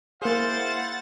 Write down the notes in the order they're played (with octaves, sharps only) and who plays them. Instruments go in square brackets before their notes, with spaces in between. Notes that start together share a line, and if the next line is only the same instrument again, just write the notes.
[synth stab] A#3 G#4 [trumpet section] E4 C5 F5 [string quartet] F#5 A6